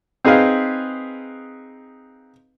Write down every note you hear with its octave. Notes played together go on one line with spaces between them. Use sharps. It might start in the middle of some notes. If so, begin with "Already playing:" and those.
C4 D#4 G#4 B4 F5